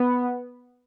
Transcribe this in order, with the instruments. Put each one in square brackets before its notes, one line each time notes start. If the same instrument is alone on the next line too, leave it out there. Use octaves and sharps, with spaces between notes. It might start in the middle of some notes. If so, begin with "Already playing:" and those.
Already playing: [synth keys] B3